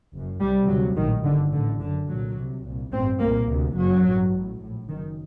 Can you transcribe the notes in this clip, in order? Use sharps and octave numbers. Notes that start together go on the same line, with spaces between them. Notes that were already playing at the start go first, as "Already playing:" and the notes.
F#1 F#2
C2 C3 G3
D2 C3 F#3
A#1 A2 D#3
G1 G2 D3
A2 D3
A1
F#1 F#2 D3
C2 A#2 F#3
C2 C3
C2 A#2
A1 G2 C4
C2 A#2 A#3
D2 C3
F#1 F#2 F#3
A1 G2
A1 A2
A#1 A2
F#1 F#2 D#3